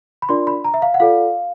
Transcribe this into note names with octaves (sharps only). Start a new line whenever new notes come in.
B5
D4 F4 A#4 D5 C6
B5
A#5
E5
F5
F#5
F4 A4 D5 F5